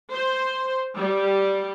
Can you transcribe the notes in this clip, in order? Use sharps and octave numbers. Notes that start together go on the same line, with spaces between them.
C5
G3